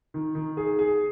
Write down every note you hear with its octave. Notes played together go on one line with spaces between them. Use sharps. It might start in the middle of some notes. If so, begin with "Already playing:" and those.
D#3
D#3
G#4
G#4